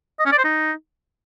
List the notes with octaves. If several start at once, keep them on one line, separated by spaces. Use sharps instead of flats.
D#5
C#4
D5
C5
D#4